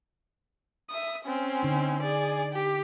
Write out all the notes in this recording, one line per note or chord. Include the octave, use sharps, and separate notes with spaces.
E5 D#6
C4 C#4
D3 D#4
G#4 D5
G4